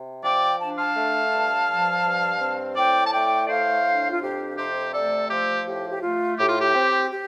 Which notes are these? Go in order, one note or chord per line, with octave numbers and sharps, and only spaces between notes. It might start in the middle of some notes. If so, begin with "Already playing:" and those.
Already playing: C3
F3 D5 G5
D4 A5
F5 A5
A3
G2
F3
G2
C4
A2 D5 G5
A5
A3 D5 G5
D5
A2 C5 F5
D4
F4
F2 G4
C3 G4 C5
A3 A4 D5
F3 G4 C5
A2 G4
G4
A3 F4
A2 G4
F4
G4
C4
G4